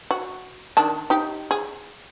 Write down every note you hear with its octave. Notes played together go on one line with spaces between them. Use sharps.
F#4
D#3 D4 A5
D#4 G4
G#4